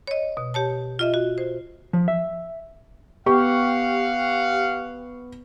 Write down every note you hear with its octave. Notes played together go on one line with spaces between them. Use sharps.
C#5 D#5
B2
G4 C#5 A5
F4 D#5 E5
F#4
C5
F3
E5
B3 G4 F5 F#5 C#6